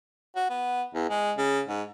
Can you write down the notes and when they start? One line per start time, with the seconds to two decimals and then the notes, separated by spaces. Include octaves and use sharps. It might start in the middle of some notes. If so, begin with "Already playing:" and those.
0.36 F#4
0.50 B3
0.94 E2
1.10 G#3
1.38 C#3
1.67 G#2